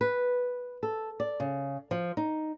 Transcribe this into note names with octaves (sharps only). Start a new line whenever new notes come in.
B4
A4
D5
C#3
F3
D#4